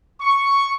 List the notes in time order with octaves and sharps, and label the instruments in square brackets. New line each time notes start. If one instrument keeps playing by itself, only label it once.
[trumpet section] C#6